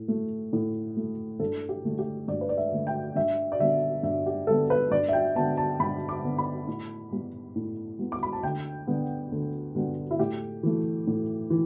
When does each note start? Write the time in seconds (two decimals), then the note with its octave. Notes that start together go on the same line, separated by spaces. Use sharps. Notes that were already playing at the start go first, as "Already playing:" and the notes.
Already playing: A2
0.08 A3
0.53 A2
0.97 A3
1.40 G2 A4
1.69 G4
1.84 D3 A3
1.99 G4
2.28 G2 D5
2.41 B4
2.49 D5
2.57 E5
2.72 D3 A3
2.87 G5
3.16 G2 E5
3.52 D5
3.59 D3 G3 B3 E5
4.03 G2 E5
4.26 G4
4.47 D3 G3 B3 A4
4.70 B4
4.91 G2 D5
5.08 E5
5.13 G5
5.35 D3 B3 A5
5.57 A5
5.80 G2 B5
6.09 D6
6.23 D3 B3
6.38 B5
6.67 A2
7.11 G3 B3
7.56 A2
7.99 G3 B3
8.12 D6
8.23 B5
8.33 A5
8.43 D2 G5
8.87 D3 G3 B3
9.32 D2
9.75 D3 G3 B3
10.11 E4
10.19 A2 G4
10.63 E3 A3
11.07 A2
11.50 E3